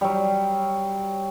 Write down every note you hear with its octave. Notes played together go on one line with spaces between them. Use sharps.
F#3 G3